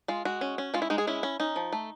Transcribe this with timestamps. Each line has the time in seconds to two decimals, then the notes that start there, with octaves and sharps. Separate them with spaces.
0.08 G#3 F4
0.25 G#3 F#4
0.41 C#4
0.58 C#4
0.74 G#3 F4
0.82 E4
0.90 G#3 D#4
0.98 G#4
1.07 C#4 E4
1.23 C#4
1.40 C#4 D#4
1.56 F3
1.73 A3